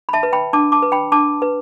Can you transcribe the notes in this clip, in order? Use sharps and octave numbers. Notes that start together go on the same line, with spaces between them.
B5
E5 A5
B4
G5 B5
D4 A5 D6
A5 D6
B4
G5 B5
D4 A5 D6
B4